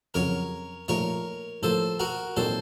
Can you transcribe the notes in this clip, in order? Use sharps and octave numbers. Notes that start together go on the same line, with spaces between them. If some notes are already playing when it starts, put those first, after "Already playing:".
F2 C#3 F#3 A#4 C#5
A#2 F3 A3 D#4 A#4 C#5
A2 F3 A#3 A4 C5
F#4 A#4
A#2 F#3 C4 D#4 A4 C5